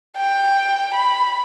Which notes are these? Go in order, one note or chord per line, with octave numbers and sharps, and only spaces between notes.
G5
B5